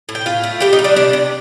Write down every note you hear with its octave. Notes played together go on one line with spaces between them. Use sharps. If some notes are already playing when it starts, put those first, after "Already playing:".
A2
G5
A2 F4 F5
A3
G3 G4 G5
D#4 D#5
G3
D4 D5
C3 D4 D5
C3